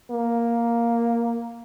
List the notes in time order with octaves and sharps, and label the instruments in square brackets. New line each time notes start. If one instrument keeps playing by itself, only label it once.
[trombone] A#3